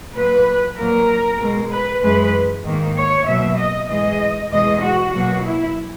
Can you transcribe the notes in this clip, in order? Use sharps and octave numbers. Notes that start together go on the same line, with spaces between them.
A#2 F#3 A#3 B4
A#2 F#3 A#3 A#4
B2 G#3
B4
F#2 E3 G#3 B4
G#2 D#3 A#3
C#5
B2 F#3 A#3 E5
D#5
G#2 E3 G#3 D#5
E2 B2 G#3 D#5
F#4
B2 F#3 A#3 F#4
E4